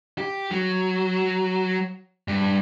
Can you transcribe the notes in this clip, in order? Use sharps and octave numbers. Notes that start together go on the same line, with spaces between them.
G4
F#3
G2